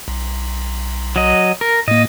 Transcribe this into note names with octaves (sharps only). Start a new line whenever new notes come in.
B1
F#3 D#5
A#4
A2 A#3 D#5